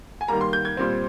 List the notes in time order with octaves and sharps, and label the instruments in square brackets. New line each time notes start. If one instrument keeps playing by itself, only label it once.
[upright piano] G#5
D#3 G3 A#3 A#5
C6
G6
G#6
A#2 G3 C4